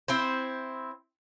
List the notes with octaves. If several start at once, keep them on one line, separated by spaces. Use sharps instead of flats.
C4 E4 C5